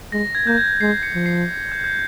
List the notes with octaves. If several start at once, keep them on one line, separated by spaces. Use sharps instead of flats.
G#3 A#6
G#6
A#3 G6
G#6
G#3 C7
C#7
F3
C7
G6
G6